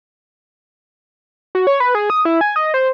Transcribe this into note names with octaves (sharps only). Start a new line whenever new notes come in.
F#4
C#5
B4
G#4
D#6
E4
G#5
D#5
C5